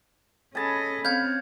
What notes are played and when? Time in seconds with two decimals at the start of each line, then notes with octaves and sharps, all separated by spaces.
0.55 C#4 G#4 A4 D#5 G#5 A5 B5
1.05 C4 C#4 F5 G6 G#6